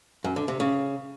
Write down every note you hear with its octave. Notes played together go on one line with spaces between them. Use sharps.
F#2
D3
C3
C#3